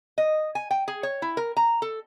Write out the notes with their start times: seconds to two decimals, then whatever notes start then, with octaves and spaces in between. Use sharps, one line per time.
0.18 D#5
0.55 G#5
0.71 G5
0.88 G#4
1.03 C#5
1.22 E4
1.37 A#4
1.57 A#5
1.82 A4